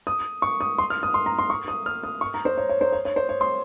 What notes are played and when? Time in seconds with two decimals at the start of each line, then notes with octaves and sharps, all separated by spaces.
0.07 D#6
0.42 C#6
0.61 D#6
0.78 C6
0.90 F6
1.03 D#6
1.14 C6
1.26 A#5
1.39 C6
1.50 C#6
1.68 D#6
1.86 F6
2.04 D#6
2.21 C#6
2.34 A#5
2.45 C5
2.58 C#5
2.69 C#5
2.81 C5
2.92 C#5
3.05 C#5
3.16 C5
3.29 C#5
3.41 C6